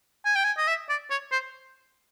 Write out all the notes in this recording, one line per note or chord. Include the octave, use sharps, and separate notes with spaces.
G#5
G5
G#5
D#5
E5
D5
C#5
C5